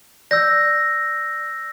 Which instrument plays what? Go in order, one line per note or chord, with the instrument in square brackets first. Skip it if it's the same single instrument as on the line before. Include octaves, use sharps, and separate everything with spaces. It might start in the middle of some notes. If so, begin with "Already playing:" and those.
[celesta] D5 [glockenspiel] E6 G6 A#6